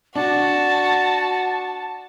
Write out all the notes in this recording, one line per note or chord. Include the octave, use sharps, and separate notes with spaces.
D4 F#4 A5